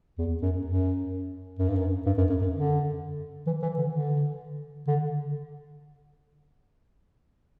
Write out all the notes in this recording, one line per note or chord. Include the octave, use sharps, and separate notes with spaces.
E2
F#2
F#2
F#2
G2
F#2
G2
F#2
F#2
F#2
D3
E3
E3
D3
D3
D3